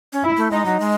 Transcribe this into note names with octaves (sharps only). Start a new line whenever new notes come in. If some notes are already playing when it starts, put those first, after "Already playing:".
C#4
E4
A3
G#3 D#4
F#3
G#3